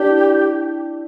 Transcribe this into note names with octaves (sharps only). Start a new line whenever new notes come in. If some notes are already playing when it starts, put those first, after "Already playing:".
Already playing: D4 E4 G4